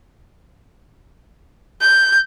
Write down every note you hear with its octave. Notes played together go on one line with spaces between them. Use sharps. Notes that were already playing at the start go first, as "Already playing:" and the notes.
G6